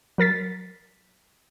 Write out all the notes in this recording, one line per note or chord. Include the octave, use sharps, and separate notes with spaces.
F#3 A#4 A6 B6